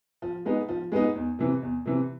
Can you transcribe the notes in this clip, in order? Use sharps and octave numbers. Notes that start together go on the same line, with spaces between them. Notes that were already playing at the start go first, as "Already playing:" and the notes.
F3
G#3 B3 D#4
F3
G#3 B3 D#4
E2
C3 E3
E2
C3 E3